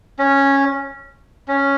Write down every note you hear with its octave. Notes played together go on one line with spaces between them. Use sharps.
C#4
C#4